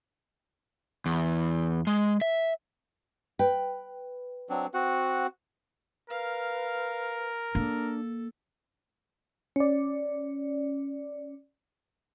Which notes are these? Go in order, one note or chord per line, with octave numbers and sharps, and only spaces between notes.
E2
G#3
E5
B4 G5
F#3 C4 D4
C4 F#4 F#5
A#4 B4 F5
A#3 D4 A4
C#4 D5